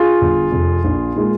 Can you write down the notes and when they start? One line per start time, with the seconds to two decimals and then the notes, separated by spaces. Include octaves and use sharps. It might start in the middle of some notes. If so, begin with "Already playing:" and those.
Already playing: F4 G#4
0.21 G1
0.52 F2 C3 F3
0.84 A#1
1.15 A#2 G#3